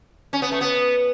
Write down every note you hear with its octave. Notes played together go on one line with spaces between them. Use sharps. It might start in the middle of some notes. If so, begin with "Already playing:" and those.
C#4
B3
A3
B3